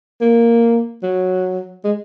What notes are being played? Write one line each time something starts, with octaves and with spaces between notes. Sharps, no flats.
A#3
F#3
G#3